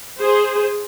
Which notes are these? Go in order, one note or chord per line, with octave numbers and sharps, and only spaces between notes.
G#4 C5